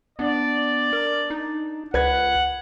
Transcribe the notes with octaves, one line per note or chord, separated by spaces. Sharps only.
B3 D4 D5
A#4
D#4
C#2 B4 F#5 G#6